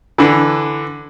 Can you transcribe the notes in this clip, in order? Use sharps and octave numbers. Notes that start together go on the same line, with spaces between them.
D3 E3